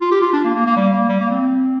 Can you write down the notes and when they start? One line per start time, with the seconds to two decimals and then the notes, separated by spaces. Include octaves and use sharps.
0.01 F4
0.11 G4
0.21 F4
0.33 D4
0.44 A#3
0.55 A#3
0.66 A#3
0.76 G3
0.93 A#3
1.09 G3
1.20 A#3
1.31 C4